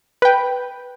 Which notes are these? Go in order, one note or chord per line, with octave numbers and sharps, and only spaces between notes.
B4 G5